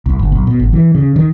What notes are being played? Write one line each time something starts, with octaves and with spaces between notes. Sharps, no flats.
C2
G1
B1
B2
G#1
E3
C#3
D#3